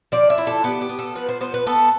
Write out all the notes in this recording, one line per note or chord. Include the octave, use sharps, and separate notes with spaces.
F3 D5
E5
E4
A4
B3 G4
G4
B3
A4
F3 B4
C5
B3 C5
B4
B3 A4